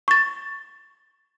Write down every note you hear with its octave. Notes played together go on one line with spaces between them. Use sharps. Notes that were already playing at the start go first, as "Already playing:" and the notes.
C#6 A6